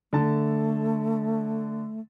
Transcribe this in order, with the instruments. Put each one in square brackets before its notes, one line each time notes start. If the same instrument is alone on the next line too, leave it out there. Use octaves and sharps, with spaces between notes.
[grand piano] D3 A5 [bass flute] A3